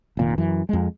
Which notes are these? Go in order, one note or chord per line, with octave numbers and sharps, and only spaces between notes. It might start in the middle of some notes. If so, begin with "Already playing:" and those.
F1 A#2 D#3
F#2 E3
F2 G#3